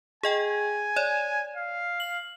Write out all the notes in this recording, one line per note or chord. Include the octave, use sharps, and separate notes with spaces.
G#4 D#5 G5 G#5
C#5 D5
F5
F#7